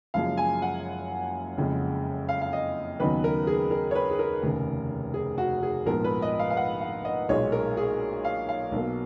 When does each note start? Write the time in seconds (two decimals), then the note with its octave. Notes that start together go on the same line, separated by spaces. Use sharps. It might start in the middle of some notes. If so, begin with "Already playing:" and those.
0.14 F#1 F#2 F3 G#3 F5
0.37 G#5
0.62 F#5
1.57 F#1 F2 C#3 G#3
2.29 F5
2.42 F5
2.53 D#5
3.00 D#2 C#3 F#3 B3 D#4 B4
3.24 A#4
3.47 G#4
3.71 A#4
3.91 C#5
3.95 B4
4.11 G#4
4.19 A#4
4.42 F1 D#2 C#3
5.14 G#4
5.38 F#4
5.63 G#4
5.86 A#1 G#2 F3 B3 A#4
6.04 B4
6.22 D#5
6.39 F5
6.50 F5
6.57 F#5
6.81 F5
7.05 D#5
7.29 B1 A#2 G#3 D#4 C#5
7.52 A#4
7.77 G#4
8.25 F5
8.49 F5
8.71 B1 B2 F#3 A#3